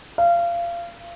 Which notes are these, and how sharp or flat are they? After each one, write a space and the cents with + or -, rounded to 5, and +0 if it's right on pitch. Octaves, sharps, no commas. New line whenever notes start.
F5 -25